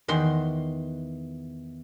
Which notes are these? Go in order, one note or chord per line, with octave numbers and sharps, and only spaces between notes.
E2 D#3 F#5 C6